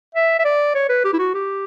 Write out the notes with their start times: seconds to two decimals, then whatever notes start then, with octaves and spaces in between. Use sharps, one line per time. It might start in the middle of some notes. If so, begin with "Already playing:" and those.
0.15 E5
0.39 E5
0.45 D5
0.75 C#5
0.89 B4
1.04 G4
1.13 E4
1.19 F#4
1.34 G4